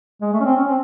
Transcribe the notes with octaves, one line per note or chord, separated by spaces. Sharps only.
G#3
A3
C#4
C4
C#4
C4